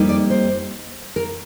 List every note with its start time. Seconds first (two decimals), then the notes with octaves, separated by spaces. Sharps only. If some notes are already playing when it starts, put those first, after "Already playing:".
Already playing: F2 G3 A#3 D#4
0.09 D5
0.30 C5
1.16 A#4